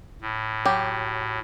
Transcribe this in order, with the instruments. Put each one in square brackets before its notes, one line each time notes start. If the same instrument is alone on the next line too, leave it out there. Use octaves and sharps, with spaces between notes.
[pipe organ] A2
[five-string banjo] F#3 G4